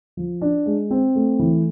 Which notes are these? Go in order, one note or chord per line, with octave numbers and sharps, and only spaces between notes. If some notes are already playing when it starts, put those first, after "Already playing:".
F3
D4
G#3
C4
A3
E3